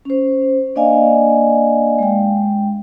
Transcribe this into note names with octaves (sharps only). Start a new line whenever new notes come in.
C#4 C5
A#3 D4 D5 D#5 F5 G#5
G#3 G5